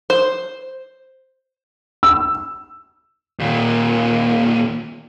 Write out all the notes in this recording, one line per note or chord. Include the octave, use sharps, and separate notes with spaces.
C5
E6
D#2 A#2